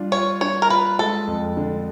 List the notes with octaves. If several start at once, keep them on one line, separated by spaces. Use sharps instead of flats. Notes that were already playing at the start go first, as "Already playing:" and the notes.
Already playing: G3 D4 F4
F4 C#5
D4 C#5
A#4
F4 B4
G#3 A4
F2
D3